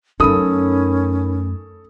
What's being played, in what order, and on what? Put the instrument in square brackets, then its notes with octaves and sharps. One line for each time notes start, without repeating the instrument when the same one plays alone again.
[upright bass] F#2 A3 [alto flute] C#4 [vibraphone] D#4 A#4 B5 [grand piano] A4 D#6